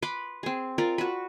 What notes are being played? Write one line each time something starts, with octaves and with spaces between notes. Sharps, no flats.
B4 B5 C6 D6
C4 G#4
F4 A#4 D5
F#4 B4